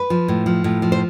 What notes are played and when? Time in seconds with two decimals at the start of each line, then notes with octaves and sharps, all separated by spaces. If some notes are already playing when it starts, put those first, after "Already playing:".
Already playing: B4
0.10 F3
0.28 A2
0.46 F3
0.64 A2
0.82 F3
0.92 C5